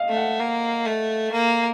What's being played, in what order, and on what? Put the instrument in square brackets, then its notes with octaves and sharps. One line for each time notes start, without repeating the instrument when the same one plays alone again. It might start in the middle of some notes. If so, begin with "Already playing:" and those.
Already playing: [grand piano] D#5 F5
[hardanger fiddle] A3
[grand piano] F#5
[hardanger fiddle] A#3
A3
A#3